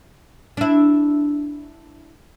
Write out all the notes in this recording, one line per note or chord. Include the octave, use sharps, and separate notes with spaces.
D4 E4